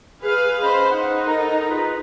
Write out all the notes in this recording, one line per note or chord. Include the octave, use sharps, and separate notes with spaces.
G#4 B4 F5
C#4 C5 D#5 B5
D#4 F#5
A4 A#4 A#5
F4 G#4 B4